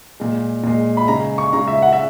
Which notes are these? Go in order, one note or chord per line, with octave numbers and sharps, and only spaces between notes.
A#2 G#3
A#2 G#3
B5
C#3 G#3 A#5
C#6
C#3 G#3 A#5
E5
F#5
E5